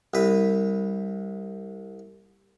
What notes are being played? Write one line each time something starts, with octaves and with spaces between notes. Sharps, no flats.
C2 B4